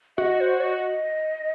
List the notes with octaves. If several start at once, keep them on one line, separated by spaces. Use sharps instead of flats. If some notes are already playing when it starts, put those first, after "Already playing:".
F#4 D#5 E5
C5
D#5